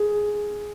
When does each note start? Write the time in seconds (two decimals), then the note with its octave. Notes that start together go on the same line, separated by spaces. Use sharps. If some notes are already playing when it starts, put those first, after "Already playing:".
Already playing: G#4